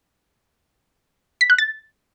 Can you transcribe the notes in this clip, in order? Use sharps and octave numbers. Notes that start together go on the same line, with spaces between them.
B6
F#6
A6